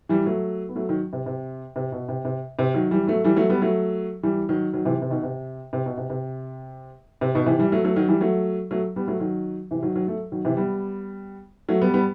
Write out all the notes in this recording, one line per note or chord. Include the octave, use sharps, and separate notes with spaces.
E3 G3
F#3 A3
B3
F#3 A3
D#3 F#3
C3
C3
C3
B2
C3
C3
C3
D#3 F#3
E3 G3
F#3 A3
E3 G3
F#3 A3
G3 B3
F#3 A3
E3 G3
D#3 F#3
D#3 F#3
C3 E3
C3
B2 D#3
C3
C3
B2
C3
C3
C3
B2 D#3
C3 E3
E3 G3
F#3 A3
F#3 A3
D#3 F#3
E3 G3
F#3 A3
F#3 A3
G3 B3
F#3 A3
D#3 F#3
C3 E3
D#3 F#3
D#3 F#3
F#3 A3
D#3 F#3
C3 E3
G3 B3
F#3 A3
G3 B3
G3 B3